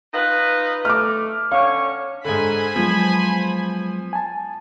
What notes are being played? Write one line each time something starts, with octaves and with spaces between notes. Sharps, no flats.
D#4 F4 B4
A3 D6 F6
D3 C#4 C#5 F5
G#2 D3 C5 G#5 B5
F3 F#3 G#3 B3
G#5 A5